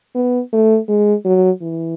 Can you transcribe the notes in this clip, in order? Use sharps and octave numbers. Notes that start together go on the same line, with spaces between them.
B3
A3
G#3
F#3
E3